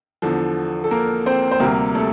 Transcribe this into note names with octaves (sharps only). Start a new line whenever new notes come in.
E2 D3 F3
A4
A#3 A#4
C4 C5
C5
D2 C3 G3 A#3 A#4
A3 A4